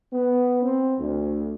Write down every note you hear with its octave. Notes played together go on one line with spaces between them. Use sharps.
B3
C4
D2